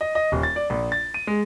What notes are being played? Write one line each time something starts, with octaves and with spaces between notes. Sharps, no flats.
D#5
D#5
D#1
A6
D5
A#1
A6
D#7
G#3